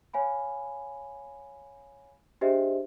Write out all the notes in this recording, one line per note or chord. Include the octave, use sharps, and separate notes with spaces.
C#5 F5 G#5 B5
D4 G4 G#4 C5 D#5 E5